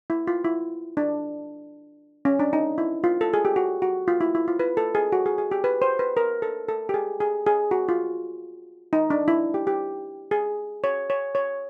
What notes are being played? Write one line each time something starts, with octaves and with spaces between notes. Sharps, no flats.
E4
F4
E4
D4
C#4
D4
D#4
E4
F4
A4
G#4
G4
F#4
F#4
F4
E4
E4
F4
B4
A4
G#4
F#4
G#4
G#4
G4
B4
C5
B4
A#4
A4
A4
G4
G#4
G#4
G#4
F#4
F4
D#4
D4
E4
G4
G4
G#4
C#5
C#5
C#5